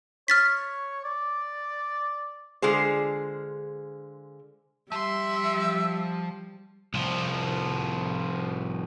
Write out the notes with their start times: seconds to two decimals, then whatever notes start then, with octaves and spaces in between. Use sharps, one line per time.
0.28 C#5 F6 A6 B6
1.04 D5
2.62 D3 G#3 F4 G#4 C5
4.92 F3 G3 E5 C6
6.94 C2 F3